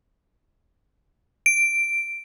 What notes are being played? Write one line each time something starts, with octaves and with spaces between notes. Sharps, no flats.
D7